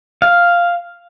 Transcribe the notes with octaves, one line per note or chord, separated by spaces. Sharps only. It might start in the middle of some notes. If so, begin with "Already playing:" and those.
F5